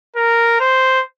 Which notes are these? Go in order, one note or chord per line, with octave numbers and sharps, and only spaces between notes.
A#4
C5